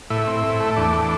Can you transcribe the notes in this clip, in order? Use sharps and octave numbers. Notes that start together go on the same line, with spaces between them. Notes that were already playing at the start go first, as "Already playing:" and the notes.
A2 E4
C4
A2
A3
E2 D4
A3